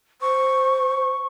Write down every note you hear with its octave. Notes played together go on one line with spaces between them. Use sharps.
C5 C#6